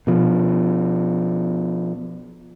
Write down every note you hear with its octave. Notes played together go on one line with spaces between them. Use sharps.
B2 F3